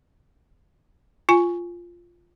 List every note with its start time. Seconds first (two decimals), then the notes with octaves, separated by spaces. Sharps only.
1.29 F4 G#5